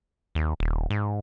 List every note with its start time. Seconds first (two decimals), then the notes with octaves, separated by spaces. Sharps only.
0.35 D#2
0.60 D#1
0.90 G#2